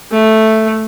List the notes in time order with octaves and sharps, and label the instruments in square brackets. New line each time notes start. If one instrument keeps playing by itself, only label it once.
[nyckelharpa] A3